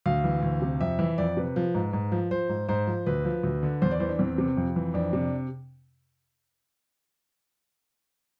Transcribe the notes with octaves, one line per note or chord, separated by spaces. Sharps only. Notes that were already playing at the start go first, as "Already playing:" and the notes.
D2 F5
E3
D2
C3
F2 E5
E3
F2 D5
C3 B4
F3
G#2
G#2
F3
F3 C5
G#2
G#2 C5
F3
D2 B4
F3
D2
D3
E2 C5
D5
E3 C5
D4
E2 C4
C3
F2
E3
F2 D4
C3